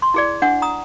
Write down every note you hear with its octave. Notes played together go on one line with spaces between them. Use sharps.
C6
E4 G#4 D5
D4 F#5
A#5 D#6